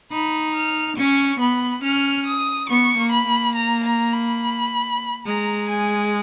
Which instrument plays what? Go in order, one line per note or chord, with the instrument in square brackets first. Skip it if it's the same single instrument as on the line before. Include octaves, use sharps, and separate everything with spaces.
[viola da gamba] D#4 [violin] B5
[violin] F6
[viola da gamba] C#4 [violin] C#6
[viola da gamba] B3 [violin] B5
[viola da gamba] C#4 [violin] F6
[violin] D#6
[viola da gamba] B3 [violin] C#6
[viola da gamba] A#3
[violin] B5
[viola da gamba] A#3
[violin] A#5
A#5
B5
[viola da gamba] G#3 [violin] A#5
[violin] G#5